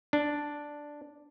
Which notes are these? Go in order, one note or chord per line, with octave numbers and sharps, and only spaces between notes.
D4